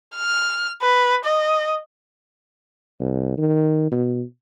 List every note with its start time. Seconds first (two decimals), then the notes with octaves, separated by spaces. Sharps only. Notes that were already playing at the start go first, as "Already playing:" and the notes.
0.16 F6
0.82 B4
1.25 D#5
3.00 C2
3.38 D#3
3.91 B2